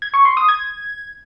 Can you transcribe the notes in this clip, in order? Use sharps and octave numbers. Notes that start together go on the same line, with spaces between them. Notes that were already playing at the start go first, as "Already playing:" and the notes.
G#6
C#6
C6
D#6
G#6